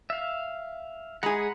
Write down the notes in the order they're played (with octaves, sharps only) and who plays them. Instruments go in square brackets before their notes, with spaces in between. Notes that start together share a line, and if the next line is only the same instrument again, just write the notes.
[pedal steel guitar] E5 F5
[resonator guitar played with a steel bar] G#3 G#4 [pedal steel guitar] F#5 A#5 B5